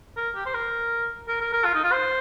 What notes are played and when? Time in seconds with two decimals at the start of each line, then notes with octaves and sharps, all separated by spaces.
0.17 A#4
0.36 G4
0.46 C5
0.54 A#4
1.29 A#4
1.41 A#4
1.53 A#4
1.65 F4
1.75 D#4
1.84 F4
1.92 C5